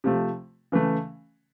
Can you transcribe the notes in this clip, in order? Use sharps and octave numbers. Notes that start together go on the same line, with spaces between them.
C3 F3 A3
C#3 E3 A3